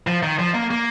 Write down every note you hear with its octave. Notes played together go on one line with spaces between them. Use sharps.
F3
D#3
F3
A#3
A#3